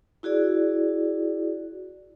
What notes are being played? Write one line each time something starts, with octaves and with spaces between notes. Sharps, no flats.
E4 F#4 G#4 D5